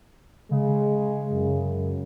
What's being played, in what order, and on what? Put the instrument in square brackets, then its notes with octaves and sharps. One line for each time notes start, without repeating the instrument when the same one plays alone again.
[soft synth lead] C#3 [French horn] G#3
[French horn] F#2